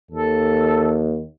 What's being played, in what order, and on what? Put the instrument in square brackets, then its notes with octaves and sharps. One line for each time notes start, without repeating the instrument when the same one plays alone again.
[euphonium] D#2 [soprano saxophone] A4